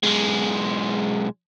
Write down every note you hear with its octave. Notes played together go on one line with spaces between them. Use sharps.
B1 G#3